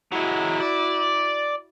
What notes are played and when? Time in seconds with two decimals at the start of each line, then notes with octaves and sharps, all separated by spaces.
0.12 F#3 G#3 E4 F#4
0.61 D5